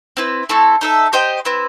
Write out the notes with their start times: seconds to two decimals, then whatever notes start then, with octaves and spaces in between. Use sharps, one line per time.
0.17 C4 E4 B4
0.49 A3 C4 E4 A4
0.81 D#4 A4 E5
1.13 G4 C5 D#5 G5
1.45 C4 E4 B4